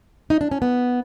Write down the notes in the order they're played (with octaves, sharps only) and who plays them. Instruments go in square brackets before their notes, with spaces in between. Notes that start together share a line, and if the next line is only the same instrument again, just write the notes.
[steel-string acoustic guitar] D#4
D4
C#4
B3